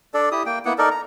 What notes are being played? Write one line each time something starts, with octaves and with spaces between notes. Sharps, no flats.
D4 A4 D5
E4 G4 D#6
A#3 G5
A#3 B3 E4 F#5
D#4 A4 A#4 D5
A#5